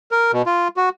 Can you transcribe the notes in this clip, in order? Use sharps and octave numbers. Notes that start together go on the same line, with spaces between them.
A#4
B2
F4
F#4